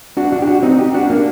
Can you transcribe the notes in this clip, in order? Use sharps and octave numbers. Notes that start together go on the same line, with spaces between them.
D4 F#4
D4 F#4
G4
D4 F#4
C4 D#4
D#4 G4
D4 F#4
A#3 D4